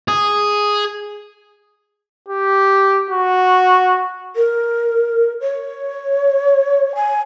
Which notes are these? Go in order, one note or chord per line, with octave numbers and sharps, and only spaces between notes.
G#4
G4
F#4
A#4
C#5
G#5